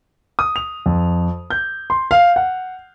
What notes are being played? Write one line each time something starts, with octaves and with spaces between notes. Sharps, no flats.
D#6
F7
F2
G6
C6
F5
F#5